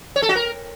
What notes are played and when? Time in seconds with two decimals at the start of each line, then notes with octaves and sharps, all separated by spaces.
0.16 C#5
0.22 A4
0.29 F#4
0.36 A#4